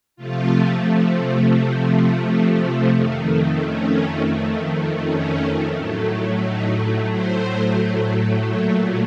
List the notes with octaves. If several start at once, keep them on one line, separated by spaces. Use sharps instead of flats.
C3 F3 A3 F4
F2 D#3 A3 D#4
C4
C#4
C#4
A2 F#3 A3
D#4
C5
A#2 F#3 A3 C#5